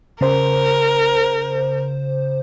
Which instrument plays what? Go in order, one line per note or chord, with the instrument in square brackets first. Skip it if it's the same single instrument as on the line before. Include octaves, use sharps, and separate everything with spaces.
[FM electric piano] C#3 C5 [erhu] A#4